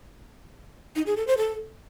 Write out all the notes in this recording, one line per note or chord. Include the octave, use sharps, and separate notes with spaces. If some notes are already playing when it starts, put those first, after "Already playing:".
D#4
G#4
A4
C5
A4